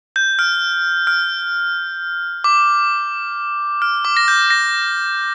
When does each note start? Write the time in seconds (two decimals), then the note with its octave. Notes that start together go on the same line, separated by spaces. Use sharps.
0.16 G6
0.39 F6
1.07 F6
2.44 D6
3.82 F6
4.05 D6
4.17 A#6
4.28 G6
4.50 A#6